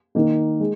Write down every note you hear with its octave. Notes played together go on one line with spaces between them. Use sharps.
D#3 A#3 D#4
G#3